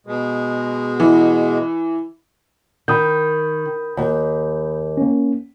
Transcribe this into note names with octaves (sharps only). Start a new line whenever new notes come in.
B2 G#3
E3
D#3 B5 D#6 G6
D#2
A#3 C#4